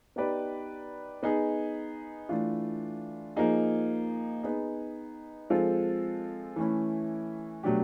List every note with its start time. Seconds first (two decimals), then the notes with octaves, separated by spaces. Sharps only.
0.16 B3 D#4 G4 B4 D5
1.23 B3 D#4 G#4
2.29 E3 A3 D4 F4
3.36 F3 A#3 D#4 G#4
4.43 B3 D#4 G#4
5.50 F3 G#3 C4 F4 A4
6.56 E3 A3 C#4 E4
7.63 B2 F#3 A3 D4 G4